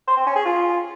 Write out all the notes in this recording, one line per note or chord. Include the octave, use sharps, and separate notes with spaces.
C5
C4
C#4
G#4
F4